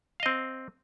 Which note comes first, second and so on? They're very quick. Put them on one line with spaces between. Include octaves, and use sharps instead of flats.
F5 D#5 C4